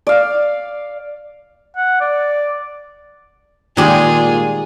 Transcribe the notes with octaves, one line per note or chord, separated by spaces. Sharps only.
D5 F5
F#5
D5
A#2 D#3 G3 G#3 F4 G#4